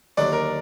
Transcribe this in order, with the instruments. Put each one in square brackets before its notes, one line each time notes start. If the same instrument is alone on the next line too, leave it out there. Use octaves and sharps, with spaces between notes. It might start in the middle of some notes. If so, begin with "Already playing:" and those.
[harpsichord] D#2 D3 F#3 [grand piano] D5
[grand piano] A#4